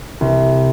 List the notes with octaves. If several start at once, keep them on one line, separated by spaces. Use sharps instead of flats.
C2